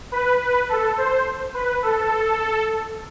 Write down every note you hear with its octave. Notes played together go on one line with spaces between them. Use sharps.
B4
B4
A4
C5
B4
A4